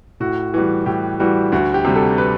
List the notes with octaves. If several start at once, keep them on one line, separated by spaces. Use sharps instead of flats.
A2 F#4
E3 G3 F#4
A2 G4
E3 G3 F#4
D2 F#4
G4
C3 G3
A4
B4